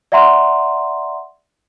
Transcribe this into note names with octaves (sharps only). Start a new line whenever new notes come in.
D5 E5 F#5 A#5 C6